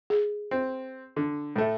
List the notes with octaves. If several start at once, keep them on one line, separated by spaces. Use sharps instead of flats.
G#4
C4
D3
A2 A3